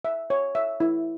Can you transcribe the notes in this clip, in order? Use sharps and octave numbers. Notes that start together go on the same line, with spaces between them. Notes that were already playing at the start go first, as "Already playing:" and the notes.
E5
C#5
E5
E4